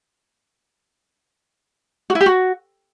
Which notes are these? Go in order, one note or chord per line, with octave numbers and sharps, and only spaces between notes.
F#4
E4
G4
F#4